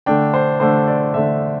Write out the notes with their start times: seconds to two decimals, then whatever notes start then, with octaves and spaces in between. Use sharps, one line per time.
0.06 D3 A3 D4 G5
0.34 C5
0.60 D3 A3 D4 C5
0.88 D5
1.14 D3 A3 D4 E5